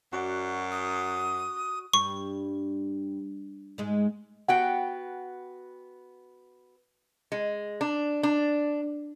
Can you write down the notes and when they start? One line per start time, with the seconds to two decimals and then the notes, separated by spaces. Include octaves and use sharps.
0.13 F#2 F#4 D5
0.71 D#6
1.93 G2 C#6
3.78 G#2 G#3
4.48 B3 F#4 F#5 G5
7.32 G#3
7.81 D4
8.23 D4